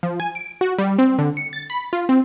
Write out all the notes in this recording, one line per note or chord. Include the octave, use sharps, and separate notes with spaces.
F3
G#5
D7
F#4
G3
C4
D3
C#7
A6
B5
F4
C4